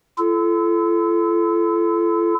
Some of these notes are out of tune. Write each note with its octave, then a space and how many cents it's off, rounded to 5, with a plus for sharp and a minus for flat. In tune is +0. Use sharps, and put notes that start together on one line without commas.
F4 -45 A4 -15